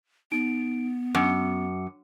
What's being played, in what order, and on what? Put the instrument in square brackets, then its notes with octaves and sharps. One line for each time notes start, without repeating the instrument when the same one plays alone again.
[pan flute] B3 [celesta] D#4 D7
[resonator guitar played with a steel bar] F#2 [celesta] D6 C#7